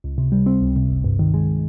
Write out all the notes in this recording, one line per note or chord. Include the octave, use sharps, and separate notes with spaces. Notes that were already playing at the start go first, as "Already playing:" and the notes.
C#2
C3
G3
C4
C#2
C3
G1
G2
D#3
G#3